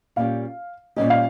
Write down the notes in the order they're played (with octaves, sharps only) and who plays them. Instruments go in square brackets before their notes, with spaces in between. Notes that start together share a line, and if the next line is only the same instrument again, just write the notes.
[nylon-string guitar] A#2 G3 C#4 G4 [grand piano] F5
[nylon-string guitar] A#2 G3 C#4 G4 [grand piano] D#5
[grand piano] F5